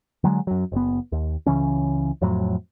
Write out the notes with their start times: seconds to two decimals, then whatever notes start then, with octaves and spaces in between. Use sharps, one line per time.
0.24 D3 F#3 G#3
0.47 F#2 F#3
0.72 F#1 B3
1.12 D#2
1.46 C#2 C#3 E3 C#4
2.22 F2 A2 F#3